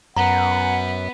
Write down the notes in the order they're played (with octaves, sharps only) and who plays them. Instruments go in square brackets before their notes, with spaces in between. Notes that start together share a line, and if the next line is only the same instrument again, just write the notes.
[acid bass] F#2 [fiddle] B3 [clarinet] F#5 [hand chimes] A#5